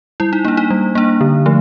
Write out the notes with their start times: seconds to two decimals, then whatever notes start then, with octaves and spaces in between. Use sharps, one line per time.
0.20 G3 E4
0.33 D#4
0.45 A#3 D4 D#4
0.57 D#4
0.70 G3
0.95 A#3 D4
1.21 D3
1.46 F3 A3